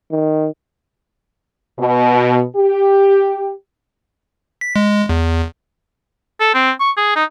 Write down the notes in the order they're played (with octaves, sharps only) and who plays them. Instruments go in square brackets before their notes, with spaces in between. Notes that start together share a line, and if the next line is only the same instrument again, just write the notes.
[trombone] D#3
[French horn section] B2
G4
[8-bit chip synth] B6
G#3
E2
[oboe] A4
C4
C#6
G#4
D#4